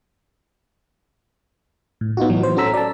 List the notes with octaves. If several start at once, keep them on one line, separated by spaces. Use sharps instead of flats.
A2
B3 D#4 F4 F#4
A2 E3 F#3
C5
C#4 F#4 A4 A#5 E6 B6
D5 A5